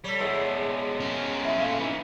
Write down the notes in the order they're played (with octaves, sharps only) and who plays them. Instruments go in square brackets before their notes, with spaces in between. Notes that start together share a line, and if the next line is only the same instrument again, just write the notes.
[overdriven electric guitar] G3 [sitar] A4 C#5
[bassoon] E2 [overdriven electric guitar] G#3 B3
[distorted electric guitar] C#4 A#4
[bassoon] E4
[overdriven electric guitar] A#2 A3 [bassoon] F4
[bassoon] E3 [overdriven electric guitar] B3 D#4